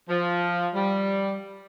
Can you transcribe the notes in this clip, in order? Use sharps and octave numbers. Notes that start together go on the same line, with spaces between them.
F3
G3